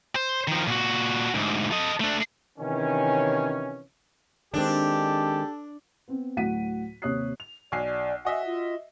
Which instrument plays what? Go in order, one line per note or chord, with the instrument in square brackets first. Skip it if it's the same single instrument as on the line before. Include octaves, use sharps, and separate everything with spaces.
[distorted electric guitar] C5
D#3 F3
A#2 F#4
D2 G#2
A4 D#5
A3 D4
[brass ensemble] C3 D#3 E3 C#4
[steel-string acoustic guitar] D#3 G#3 C4 [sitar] D4 [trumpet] G4 [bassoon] A4
[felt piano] B3 C4
D2 A2 F#3 F#5 B6 D#7
D#2 C3 C#5 D#6 F#6 C7
[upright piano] F7
[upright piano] B1 G#5 C7 [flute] D5
[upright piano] F#4 D#5 E5 [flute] G#5
[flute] F4